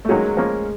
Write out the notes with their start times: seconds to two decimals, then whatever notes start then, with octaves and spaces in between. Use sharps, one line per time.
0.05 A3
0.09 D#3 F#3 G#3 A#3 C#4 F#4
0.37 F3 A#3 C#4